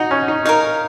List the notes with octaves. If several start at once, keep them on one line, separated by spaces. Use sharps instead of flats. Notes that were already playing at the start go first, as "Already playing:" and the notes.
Already playing: D#4 F#4 D#5
C#4
D#4
D#4 A#4 C#5 F5